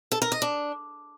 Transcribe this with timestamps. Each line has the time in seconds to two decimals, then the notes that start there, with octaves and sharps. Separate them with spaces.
0.12 A4
0.22 A#4
0.32 D#5
0.42 D4